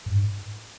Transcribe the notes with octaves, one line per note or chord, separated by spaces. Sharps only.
G2
G#2